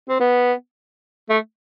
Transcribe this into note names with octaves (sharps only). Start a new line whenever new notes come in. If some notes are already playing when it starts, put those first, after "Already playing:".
C4
B3
A3